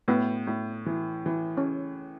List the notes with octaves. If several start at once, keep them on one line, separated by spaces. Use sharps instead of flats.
A2 B3
A2
E3
E3
C#4